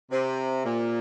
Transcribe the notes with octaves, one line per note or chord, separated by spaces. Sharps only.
C3
A#2